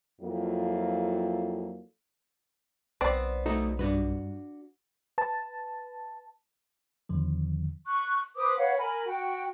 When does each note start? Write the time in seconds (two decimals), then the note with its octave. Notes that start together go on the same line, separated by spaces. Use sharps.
0.22 F2 F#3 A#3 E4 F4 A4
3.01 B1 B3 C4 D5
3.46 A3 D#4 F#4 A4
3.79 G2 D4 F#4 B4
5.18 B4 A5
7.09 E2 D3 D#3 F3
7.87 C#6 F#6
8.36 B4 C5 D6 D#6
8.57 B4 C#5 F5 F#5
8.78 A#4 G#5 B5
9.06 F#4 G5